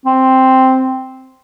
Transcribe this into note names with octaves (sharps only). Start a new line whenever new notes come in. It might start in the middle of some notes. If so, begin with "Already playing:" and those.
C4